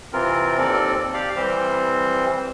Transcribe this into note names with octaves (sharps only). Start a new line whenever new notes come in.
C3 E3 C4 F4 A#4
D#2 C4 A4 D5
G4 D5 F5
E3 G3 C4 C5